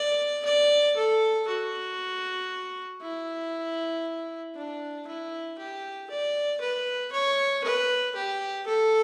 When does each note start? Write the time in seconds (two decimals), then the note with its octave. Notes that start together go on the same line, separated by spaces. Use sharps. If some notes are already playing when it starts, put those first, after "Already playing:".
Already playing: D5
0.45 D5
0.96 A4
1.47 F#4
3.02 E4
4.55 D4
5.07 E4
5.59 G4
6.10 D5
6.61 B4
7.12 C#5
7.64 B4
8.15 G4
8.67 A4